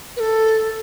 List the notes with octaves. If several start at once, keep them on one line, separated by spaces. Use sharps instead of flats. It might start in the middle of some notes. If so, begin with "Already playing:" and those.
B4
A4